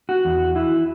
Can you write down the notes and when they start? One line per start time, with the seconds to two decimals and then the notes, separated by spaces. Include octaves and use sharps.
0.09 F#4
0.25 E2
0.55 E3 E4